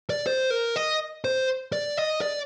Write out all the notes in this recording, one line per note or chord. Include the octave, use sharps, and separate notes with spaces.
D5
C5
A#4
D#5
C5
D5
D#5
D5